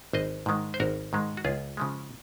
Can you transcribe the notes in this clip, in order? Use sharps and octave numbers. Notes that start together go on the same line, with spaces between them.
G#1 C5 D#5
G#2 D#3 G#3
C5
G#1 F#4 A#4
G#2 D#3 G#3
F#4
C#2 F4 G#4
C#3 F3 G#3